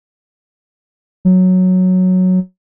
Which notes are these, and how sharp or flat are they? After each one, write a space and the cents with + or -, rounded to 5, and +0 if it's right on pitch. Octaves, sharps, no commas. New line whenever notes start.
F#3 -5